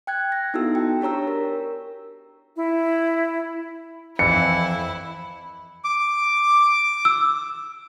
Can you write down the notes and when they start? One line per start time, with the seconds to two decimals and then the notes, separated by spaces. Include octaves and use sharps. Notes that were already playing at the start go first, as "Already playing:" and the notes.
0.07 G5 F#6 G#6
0.32 A#6
0.54 B3 D#4 E4 F#4 A4 E6
0.75 G5
1.01 D4 G4 C#5 A#5 E6
1.27 A#4
2.56 E4
4.19 F2 E3 E4 C#7
5.84 D6
7.05 E6